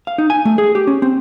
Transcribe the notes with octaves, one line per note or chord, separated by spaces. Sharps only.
F5
D#4
G#5
A3
G#4
G4
C#4
C4